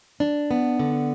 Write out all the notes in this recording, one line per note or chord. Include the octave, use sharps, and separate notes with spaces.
D4
B3
D3